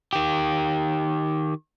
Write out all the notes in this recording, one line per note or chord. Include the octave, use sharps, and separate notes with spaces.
D#3 G4